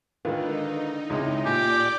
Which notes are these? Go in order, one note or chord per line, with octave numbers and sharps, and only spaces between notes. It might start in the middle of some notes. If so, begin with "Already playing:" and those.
D3 D#3 G#3 D#4 F4 B4
C#2 G#3 C4 E4
A#2 G4 D5 G5 G#5 D6